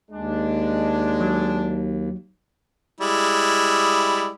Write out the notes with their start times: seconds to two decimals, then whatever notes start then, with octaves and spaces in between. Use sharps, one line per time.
0.11 D#2 G#3 D4
1.21 F#3
3.01 G3 G#3 E4